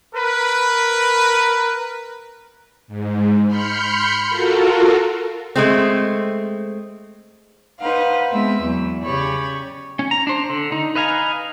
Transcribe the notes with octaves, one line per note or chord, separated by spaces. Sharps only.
A#4 B4
G#2
B5 C6 F6 G6 C#7
F4 F#4 A4 A#4
G#3 A3 C4
D#4 B4 C5 F5 F#5
G#3 B3 C4 E5
E2 F#3
C#3 G4 C#5 D5 B5
C#4
A#5
D4 C5
D3
D#4
B4 D#5 F5 G#5 A#5